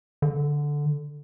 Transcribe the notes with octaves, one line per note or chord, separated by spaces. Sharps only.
D3